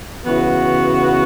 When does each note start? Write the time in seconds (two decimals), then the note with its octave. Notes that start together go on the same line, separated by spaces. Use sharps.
0.25 C#3 E3 B3 F#4